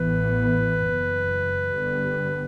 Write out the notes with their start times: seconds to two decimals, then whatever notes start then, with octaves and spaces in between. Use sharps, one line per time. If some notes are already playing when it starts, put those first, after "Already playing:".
Already playing: A1 A2 E3 B3 B4
0.81 F#1 F#2 E3
1.72 G2 D3 G3 B3